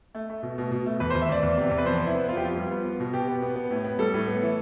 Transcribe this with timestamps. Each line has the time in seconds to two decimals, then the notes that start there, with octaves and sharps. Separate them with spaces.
0.15 A3
0.30 A3
0.43 B2
0.58 B2
0.71 B2
0.86 A3
1.00 E2 B4
1.10 E2 C5
1.22 E5
1.29 E2 D5
1.43 E2
1.57 C3
1.71 E2
1.78 B4
1.85 F2 C5
1.99 B3
2.07 E4
2.15 B3
2.28 B3 F4
2.37 G4
2.42 F2 F4
2.57 G3
2.71 B3
2.85 B3
3.00 B2
3.13 B2 G4
3.28 B3
3.42 B3
3.56 B3
3.71 A2
3.84 B3
3.99 G3 A4
4.14 A2
4.28 B3
4.42 E3